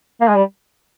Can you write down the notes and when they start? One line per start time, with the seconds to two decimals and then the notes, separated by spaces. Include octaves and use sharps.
0.21 A#3
0.28 G#3
0.35 G3